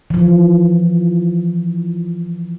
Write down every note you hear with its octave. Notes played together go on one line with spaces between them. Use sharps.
E3 F3